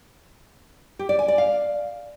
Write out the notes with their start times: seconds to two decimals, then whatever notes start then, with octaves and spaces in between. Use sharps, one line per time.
0.99 G4
1.09 D5
1.19 G#5
1.28 D5
1.38 F5